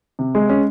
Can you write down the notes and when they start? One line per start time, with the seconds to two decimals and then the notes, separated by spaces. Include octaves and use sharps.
0.19 C3
0.35 G#3
0.49 C#4